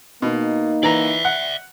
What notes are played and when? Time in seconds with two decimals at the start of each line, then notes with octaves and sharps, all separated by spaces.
0.22 B2 A#3 D#4
0.83 E3 D5 E5 A#5
1.25 F#5